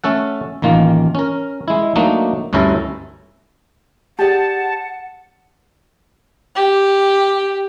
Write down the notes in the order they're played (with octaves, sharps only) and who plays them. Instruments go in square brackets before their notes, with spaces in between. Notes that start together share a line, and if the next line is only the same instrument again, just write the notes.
[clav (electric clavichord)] A3 C#4 A4 F#5
A1 D#3 A#3 F4
C#4 A#4
G#3 E4
F#3 A3 A#3 D4 D#4
D2 G2 C#4 E4 A4 A#5
[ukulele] G4 G#4 D5 [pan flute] F#5 [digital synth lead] A5
[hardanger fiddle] G4